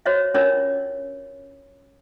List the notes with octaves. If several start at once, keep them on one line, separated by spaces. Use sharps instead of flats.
F#4 C5 C#5 D#5 E5
C#4 D4 F4 A#4 C#5 D#5